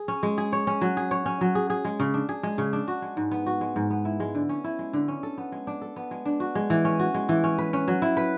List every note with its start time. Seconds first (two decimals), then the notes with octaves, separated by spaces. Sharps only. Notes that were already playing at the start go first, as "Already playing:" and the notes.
Already playing: G#4
0.08 C#4
0.23 G#3
0.38 G#4
0.53 C#5
0.67 C#4
0.81 F#3
0.97 G#4
1.11 C#5
1.26 C#4
1.41 F#3
1.55 G#4
1.70 G#4
1.85 G#3
2.00 C#3
2.14 D4
2.29 G#4
2.43 G#3
2.58 C#3
2.73 D4
2.88 F#4
3.02 G#3
3.17 G#2
3.31 B3
3.46 F#4
3.61 G#3
3.76 G#2
3.90 B3
4.05 E4
4.20 G#3
4.35 D3
4.49 C#4
4.64 E4
4.79 G#3
4.93 D3
5.08 C#4
5.23 A4
5.38 B3
5.52 G#3
5.67 D4
5.81 A4
5.96 B3
6.11 G#3
6.25 D4
6.40 F#4
6.55 G#3
6.70 E3
6.85 C#4
6.99 F#4
7.14 G#3
7.29 E3
7.44 C#4
7.58 B4
7.73 C#4
7.88 F#3
8.02 E4
8.17 B4